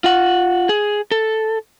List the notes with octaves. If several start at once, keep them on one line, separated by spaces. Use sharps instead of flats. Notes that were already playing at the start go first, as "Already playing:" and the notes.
F4 F#5
G#4
A4